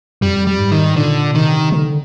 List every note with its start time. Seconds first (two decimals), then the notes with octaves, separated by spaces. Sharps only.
0.21 F2 G3
0.47 G3
0.59 G#2
0.72 D#3
0.96 A#2 D3
1.34 C3 D#3
1.72 D3